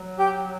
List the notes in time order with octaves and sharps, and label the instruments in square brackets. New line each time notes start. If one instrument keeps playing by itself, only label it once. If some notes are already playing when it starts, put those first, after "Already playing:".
Already playing: [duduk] F#3
[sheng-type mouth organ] G4